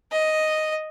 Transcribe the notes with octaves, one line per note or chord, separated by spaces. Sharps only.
D#5